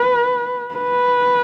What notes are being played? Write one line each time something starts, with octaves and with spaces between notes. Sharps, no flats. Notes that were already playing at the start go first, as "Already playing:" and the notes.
Already playing: B4
B4